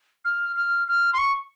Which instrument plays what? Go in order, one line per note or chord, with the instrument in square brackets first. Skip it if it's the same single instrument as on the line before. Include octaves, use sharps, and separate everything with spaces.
[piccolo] F6
F6
F6
C6
C#6